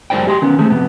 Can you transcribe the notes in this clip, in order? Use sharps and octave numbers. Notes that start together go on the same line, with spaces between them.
F#2 G#3 F4 C5 D5 G5
G4 D#5 C6
D#3 B3 C#4
G#3 A3 C4 G#4
F2 C3 B3